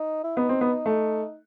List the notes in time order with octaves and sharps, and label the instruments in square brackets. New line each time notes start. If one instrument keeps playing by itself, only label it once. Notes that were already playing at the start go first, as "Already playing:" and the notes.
Already playing: [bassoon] D#4
E4
[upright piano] B3 [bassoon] D#4
[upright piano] C4
B3
A3